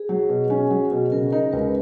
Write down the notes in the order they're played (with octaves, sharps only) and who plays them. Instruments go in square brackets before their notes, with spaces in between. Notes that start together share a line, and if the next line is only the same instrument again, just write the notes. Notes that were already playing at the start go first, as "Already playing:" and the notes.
Already playing: [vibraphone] G#4
[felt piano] F#3
B2
C#4
F#3
B2
[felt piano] C#3 [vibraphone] A#4
[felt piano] D#4 [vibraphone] A#4
[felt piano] C#2 [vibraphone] B4